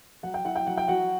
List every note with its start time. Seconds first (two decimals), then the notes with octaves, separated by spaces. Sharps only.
0.23 F#3 F#5
0.34 G5
0.45 E4 F#5
0.56 G5
0.67 F#3 F#5
0.77 G5
0.88 F#3 F#4 F#5